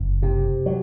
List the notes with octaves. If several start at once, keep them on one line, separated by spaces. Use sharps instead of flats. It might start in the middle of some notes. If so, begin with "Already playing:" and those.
Already playing: F#1
C3
F#3